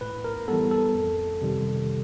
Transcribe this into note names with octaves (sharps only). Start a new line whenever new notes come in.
A2 B4
A#4
E3 G3 B3 A4
A4
F2
C3 D#3 G3